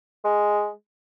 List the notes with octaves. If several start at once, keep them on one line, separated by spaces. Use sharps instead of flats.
G#3